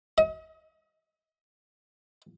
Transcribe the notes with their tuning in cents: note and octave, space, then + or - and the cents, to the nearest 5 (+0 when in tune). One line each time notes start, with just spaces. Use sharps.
D#5 +40